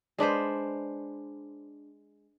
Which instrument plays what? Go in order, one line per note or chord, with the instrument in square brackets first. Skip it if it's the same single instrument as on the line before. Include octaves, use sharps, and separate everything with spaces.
[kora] G#3 D4 B4 C5